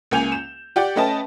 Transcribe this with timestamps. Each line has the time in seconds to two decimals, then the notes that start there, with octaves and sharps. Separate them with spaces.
0.11 C#2 A#3 G#5 G6 F7
0.32 E7
0.76 G4 D5 F#5 G5
0.96 A3 C#4 B4 D#5 G5 A5